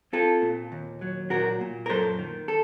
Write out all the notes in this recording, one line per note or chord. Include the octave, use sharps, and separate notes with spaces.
C4 F4 A4
A#2
D#2
F#3
A#2 F#4 A#4
A#2
A#4
F#2 A4 C5
D#3
A4